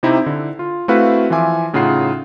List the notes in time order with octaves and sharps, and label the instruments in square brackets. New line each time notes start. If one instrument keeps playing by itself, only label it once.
[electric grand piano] C3 C4 D#4 E4 G4
D3 E4
F4
A3 C4 E4 F#4 B4 F5
E3 F3 F4 E5 G#5 D6
A2 C#3 D#4 F4 F#5 C7